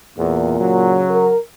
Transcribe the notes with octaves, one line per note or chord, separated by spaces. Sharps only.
E2 A#2
C#3 F#3
A#4